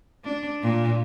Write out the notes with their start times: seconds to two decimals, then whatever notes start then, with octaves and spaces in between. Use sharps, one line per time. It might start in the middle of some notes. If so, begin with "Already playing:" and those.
0.24 D4
0.62 A#2